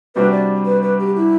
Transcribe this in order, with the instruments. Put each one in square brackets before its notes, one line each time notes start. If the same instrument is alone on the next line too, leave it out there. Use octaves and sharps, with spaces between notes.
[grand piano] C3 G3 D4 F#4 [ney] B4
[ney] D5
B4
B4
G4
E4